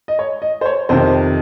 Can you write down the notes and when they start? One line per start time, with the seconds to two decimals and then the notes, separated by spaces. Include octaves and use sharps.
0.08 D#5
0.19 C#5
0.42 D#5
0.61 C5
0.66 C#5
0.89 F2 C3 D#3 C5